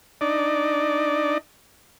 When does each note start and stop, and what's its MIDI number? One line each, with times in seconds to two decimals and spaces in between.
0.21 1.38 62
0.21 1.38 63
0.21 1.38 74